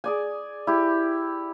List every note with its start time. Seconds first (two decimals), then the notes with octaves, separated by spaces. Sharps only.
0.04 G#4 D5 G#5
0.67 E4 G4